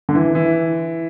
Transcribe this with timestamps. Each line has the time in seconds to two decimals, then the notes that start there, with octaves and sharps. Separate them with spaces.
0.09 D3
0.15 E3
0.35 E3